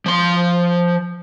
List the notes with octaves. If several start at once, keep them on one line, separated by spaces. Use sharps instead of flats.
F3 C6